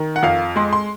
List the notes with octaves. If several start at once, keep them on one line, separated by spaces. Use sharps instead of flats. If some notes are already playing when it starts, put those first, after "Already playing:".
Already playing: D#3
F#5
F2 F5
G#3 C6
C6